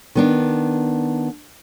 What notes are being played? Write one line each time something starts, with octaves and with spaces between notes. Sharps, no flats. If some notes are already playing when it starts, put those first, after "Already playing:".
D#3 B3 D4